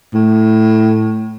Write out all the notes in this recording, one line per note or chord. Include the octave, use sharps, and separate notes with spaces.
A2